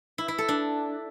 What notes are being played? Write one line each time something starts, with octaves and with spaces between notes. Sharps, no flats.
E4
E4
A4
D4